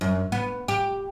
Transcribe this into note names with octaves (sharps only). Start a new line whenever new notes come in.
F#2
B3
G4